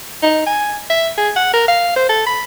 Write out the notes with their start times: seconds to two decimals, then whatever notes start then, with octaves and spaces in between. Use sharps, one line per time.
0.23 D#4
0.46 G#5
0.90 E5
1.18 G#4
1.36 F#5
1.54 A#4
1.68 F5
1.96 C5
2.09 A4
2.26 B5